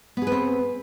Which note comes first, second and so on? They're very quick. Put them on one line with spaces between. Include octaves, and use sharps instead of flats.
B3 G#4 B4 C4